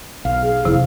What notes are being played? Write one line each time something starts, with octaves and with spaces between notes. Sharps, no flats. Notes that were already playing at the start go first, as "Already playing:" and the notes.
B1 F5
G#4
F#1 F2 C3 E4